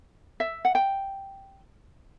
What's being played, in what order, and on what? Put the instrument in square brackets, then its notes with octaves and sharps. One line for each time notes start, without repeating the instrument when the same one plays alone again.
[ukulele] E5
F#5
G5